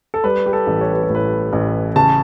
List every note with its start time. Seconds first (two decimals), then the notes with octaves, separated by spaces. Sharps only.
0.14 A4
0.24 G3 B4
0.46 G4
0.53 A4
0.67 A1
0.81 C#5
0.92 B4
1.03 A4
1.09 A2
1.15 B4
1.53 A1
1.96 C#3 A5